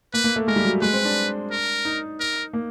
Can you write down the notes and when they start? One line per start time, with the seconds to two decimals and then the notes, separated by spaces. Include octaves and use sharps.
0.13 A#3 B4
0.24 A#3
0.36 A3
0.47 G#3 A#4
0.56 G3
0.64 F#3
0.81 G#3 B4
0.93 C4
1.05 D4
1.51 A#4
1.85 D#4
2.20 A#4
2.53 A#3